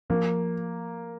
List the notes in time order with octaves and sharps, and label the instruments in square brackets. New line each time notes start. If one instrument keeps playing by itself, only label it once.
[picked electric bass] F3 [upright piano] A#3